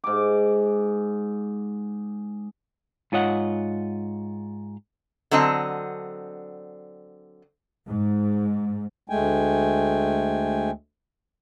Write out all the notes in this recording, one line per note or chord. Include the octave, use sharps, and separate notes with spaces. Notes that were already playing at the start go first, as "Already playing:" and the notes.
G#2 D6
G#2 F4 C#5 D#5 F#5
D3 F#3 C4 D#5 A5
G#2
D2 G#3 A3 G5 G#5